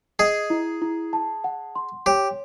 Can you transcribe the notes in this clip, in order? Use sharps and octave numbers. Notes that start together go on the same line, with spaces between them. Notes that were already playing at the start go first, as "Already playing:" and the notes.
G#4 D#5
E4
E4
A5
F#5
C6
G4 C#5